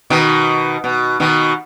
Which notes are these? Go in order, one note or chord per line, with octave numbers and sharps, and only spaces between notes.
B2 D#3
B2
B2 D#3